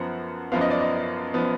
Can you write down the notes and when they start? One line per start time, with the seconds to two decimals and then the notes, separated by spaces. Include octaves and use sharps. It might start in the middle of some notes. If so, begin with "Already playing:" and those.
Already playing: F#2 F3 B3 F#5
0.52 F#2 F3 B3 F5
0.61 D#5
0.70 D5
0.80 D#5
1.34 F3 B3